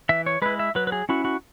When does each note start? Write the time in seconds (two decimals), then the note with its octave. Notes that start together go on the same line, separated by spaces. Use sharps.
0.09 E3 E5
0.26 C#5
0.42 G#3 E4 B4
0.59 E5
0.75 F#3 B4
0.87 B4
0.92 G#4
1.09 C#4 E4 F#4
1.25 F#4